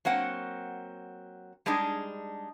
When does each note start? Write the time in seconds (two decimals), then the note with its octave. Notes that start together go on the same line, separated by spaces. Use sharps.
0.05 F#3 A#3 C4 F#5
1.66 G3 G#3 D4 D#4 G#4